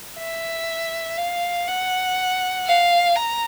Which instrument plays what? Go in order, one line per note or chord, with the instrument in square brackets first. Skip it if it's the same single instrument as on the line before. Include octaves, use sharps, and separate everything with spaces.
[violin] E5
F5
F#5
F5
A#5